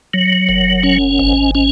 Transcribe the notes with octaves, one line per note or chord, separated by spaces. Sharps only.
F#3
F#1
C#4
G#1
C#4